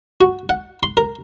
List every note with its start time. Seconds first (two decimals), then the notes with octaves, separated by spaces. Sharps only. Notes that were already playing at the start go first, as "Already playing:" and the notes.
0.21 F#4
0.49 F#5
0.83 C6
0.97 A#4